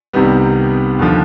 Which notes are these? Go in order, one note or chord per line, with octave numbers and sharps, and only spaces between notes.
C2 C3 D#3 G3 B3
D#2 D3 F3